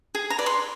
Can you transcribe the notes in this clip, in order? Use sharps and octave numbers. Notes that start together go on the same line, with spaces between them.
G#4
A#5
B4 D5
C6